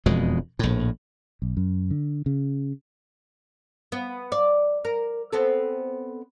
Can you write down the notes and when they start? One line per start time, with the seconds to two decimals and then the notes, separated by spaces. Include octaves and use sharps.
0.06 E1 F2 B2 G#3
0.59 A#1 A2
1.42 B1
1.57 F#2
1.91 D3
2.26 C#3
3.92 B3
4.32 D5
4.85 A#4
5.33 B3 C4 A4